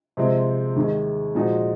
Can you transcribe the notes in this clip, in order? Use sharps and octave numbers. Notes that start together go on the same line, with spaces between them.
C3 F3 G#3 C4
D#2 D#3 G#3
A#2 F3 G#3 D#4 F#4